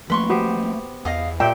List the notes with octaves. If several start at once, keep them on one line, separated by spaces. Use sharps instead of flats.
F3 A3 A#3 B4 C6 C#6
B3 F#4 G4 C5
E2 D#5 F5 D#6
A#2 G4 E5 G5